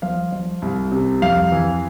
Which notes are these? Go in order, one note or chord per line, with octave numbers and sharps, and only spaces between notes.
F3 F5
F3
C2
C3
F2 F5
E3